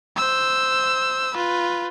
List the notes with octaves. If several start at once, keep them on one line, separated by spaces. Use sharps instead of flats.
C5 E6
F4 B4